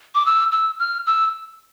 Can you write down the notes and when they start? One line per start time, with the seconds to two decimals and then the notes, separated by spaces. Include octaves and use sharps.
0.15 D6
0.26 E6
0.52 E6
0.79 F6
1.06 E6